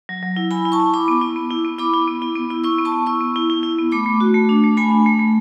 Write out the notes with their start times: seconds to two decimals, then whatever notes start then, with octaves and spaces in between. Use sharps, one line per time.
0.09 F#3
0.23 F#3
0.37 E4
0.51 E4 G#5 B5
0.65 E4
0.72 A5 C#6
0.80 E4
0.93 E4 B5 D6
1.08 B3
1.22 E4
1.36 B3
1.51 E4
1.65 B3
1.78 E4 B5 D6
1.94 E4
2.08 B3
2.22 E4
2.35 B3
2.50 E4
2.64 E4 C#6 E6
2.78 B3
2.85 A5 C#6
2.92 B3
3.06 E4 C#6 E6
3.21 B3
3.36 E4
3.50 E4
3.63 E4
3.78 B3
3.92 A3 B5 D6
4.06 A3
4.20 F#4
4.34 A3
4.49 D4
4.64 A3
4.77 A3 G#5 B5
4.91 D4
5.06 A3
5.19 A3